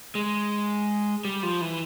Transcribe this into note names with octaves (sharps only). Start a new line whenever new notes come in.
G#3
G3
F3
E3